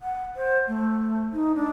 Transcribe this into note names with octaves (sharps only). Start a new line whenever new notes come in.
F#5
C5
A3
D#4
D4